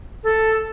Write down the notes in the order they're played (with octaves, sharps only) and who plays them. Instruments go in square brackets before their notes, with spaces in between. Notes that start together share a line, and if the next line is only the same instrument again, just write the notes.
[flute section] A4